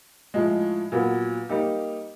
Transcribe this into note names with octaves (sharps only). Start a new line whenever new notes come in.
A2 F3 G#3
A#2 F#3 B3
G3 A#3 D#4 G4